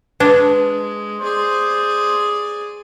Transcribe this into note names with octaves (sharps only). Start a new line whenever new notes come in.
G#3 D4 B4
G#4 C5 D5